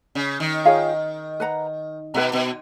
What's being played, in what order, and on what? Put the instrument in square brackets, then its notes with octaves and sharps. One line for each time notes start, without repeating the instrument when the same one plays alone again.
[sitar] C#3
D#3
[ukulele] F4 G#4 C#5 F5
B4 F#5 A#5
[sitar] B2 [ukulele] B4 F#5 A#5
[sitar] B2